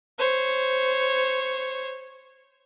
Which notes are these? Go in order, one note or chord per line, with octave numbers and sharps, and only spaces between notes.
C5 C#5